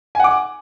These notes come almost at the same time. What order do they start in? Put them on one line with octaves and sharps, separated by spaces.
G#5 F#5 D6